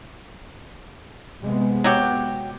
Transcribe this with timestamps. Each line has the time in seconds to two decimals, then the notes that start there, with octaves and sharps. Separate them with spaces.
1.42 C3 G#3 B3
1.84 F#3 F#4 G4